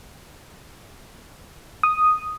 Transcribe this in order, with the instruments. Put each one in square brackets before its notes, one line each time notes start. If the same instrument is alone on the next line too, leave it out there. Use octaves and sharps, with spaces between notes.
[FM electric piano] D#6